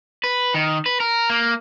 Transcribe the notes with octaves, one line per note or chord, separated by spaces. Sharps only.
B4
D#3
B4
A#4
A#3